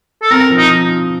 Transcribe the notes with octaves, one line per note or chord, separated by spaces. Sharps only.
A4
C4 A#4
F3
D#4